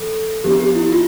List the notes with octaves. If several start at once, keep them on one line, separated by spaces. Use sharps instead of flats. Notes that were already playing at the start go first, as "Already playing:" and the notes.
Already playing: F3 A4
F3 B3 D4 G4
G4
E4
F4